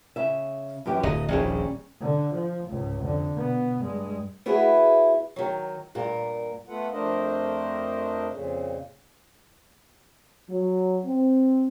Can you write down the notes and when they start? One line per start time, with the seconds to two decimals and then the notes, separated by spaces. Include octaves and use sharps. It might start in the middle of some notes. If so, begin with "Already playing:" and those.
0.16 C#3 E5
0.86 F#2 E3 G4
1.03 D1 D#5
1.29 D#1 A#1 G3 C#4 G#4
2.01 D3
2.35 F3
2.70 C#2 G#2
3.01 F2 D3
3.34 B2 B3
3.81 G2 G#3
4.46 B3 E4 F#4 G#4
5.36 D#3 F#3
5.95 G2 A#2 A#4
6.67 A3 B3 F4 A4 B4 F#5
6.93 F2 A3 D4 A#4 C5 D#5
8.30 F2 A#2 C#3
10.49 F#3
11.05 C4